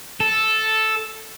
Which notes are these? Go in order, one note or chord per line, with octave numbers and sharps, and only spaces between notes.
A4